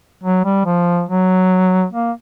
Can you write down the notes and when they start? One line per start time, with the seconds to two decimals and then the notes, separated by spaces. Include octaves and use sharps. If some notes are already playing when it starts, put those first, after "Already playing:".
0.24 F#3
0.45 G3
0.66 F3
1.09 F#3
1.93 A#3